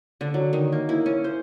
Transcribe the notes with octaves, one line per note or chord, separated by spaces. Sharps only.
D3
F#3
D#3
A#3
E4
C#4
C5